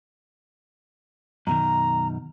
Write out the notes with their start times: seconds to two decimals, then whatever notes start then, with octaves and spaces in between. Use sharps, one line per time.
1.47 F#2 B2 D#3 A#5